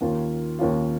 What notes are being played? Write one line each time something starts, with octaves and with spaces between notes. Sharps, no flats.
D#2 D#3 A#3 C#4 F4
D#2 D#3 A#3 C#4 F4